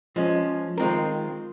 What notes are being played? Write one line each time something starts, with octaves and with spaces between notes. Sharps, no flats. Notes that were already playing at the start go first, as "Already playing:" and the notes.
F3 G#3 C#4
D#3 G#3 C4 F4 A#4